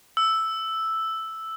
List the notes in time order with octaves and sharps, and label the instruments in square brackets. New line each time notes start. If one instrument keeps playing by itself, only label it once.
[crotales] E6